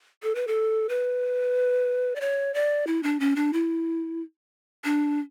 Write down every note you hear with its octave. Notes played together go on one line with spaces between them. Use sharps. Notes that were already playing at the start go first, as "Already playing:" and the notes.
A4
B4
A4
B4
D5
C#5
D5
E4
D4
C#4
D4
E4
D4